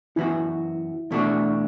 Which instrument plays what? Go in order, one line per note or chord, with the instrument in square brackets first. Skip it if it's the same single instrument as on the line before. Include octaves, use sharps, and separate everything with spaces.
[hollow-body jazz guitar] F#2 E3 B3 F#4 [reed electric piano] E4
[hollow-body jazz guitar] E2 B2 A3 D4 F#4